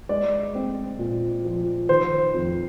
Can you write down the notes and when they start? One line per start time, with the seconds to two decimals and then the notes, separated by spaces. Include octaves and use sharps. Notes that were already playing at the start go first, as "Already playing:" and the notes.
0.09 G#3 D5
0.55 C4
0.99 A#2
1.44 F3
1.89 D#3 C5
2.34 F2